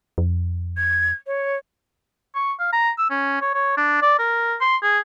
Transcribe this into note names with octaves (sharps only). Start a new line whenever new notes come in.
F2
G#6
C#5
C#6
F5
A#5
E6
C#4
C#5
C#5
D4
D5
A#4
C6
G#4